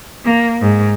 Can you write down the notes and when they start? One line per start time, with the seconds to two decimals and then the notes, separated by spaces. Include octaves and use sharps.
0.24 A#3
0.61 G#2